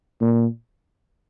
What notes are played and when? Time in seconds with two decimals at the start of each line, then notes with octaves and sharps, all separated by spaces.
0.21 A#2